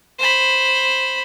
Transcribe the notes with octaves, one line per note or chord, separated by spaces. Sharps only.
C5 B5